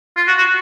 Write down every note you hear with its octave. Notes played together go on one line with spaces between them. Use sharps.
F4
F#4
F#4